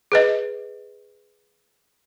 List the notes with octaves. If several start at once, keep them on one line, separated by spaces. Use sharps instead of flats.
G#4 B4 D#5